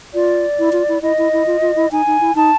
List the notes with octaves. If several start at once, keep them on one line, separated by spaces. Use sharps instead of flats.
F4 D5
E4
F4
E4
E4 D#5
E4
E4
F4
F4
E4
D#4 G#5
D#4
E4
D#4 A5